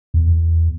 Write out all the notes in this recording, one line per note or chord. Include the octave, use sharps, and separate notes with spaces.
E2